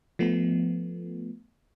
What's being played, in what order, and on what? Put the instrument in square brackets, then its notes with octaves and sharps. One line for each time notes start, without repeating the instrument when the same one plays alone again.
[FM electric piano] F3 A3 B3